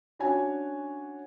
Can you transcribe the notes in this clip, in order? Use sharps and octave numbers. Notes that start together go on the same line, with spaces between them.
C#4 D4 F#4 C#5 G#5